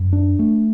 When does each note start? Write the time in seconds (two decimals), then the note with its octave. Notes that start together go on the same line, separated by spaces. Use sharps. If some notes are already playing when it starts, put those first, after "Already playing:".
Already playing: F#2
0.13 D4
0.39 A3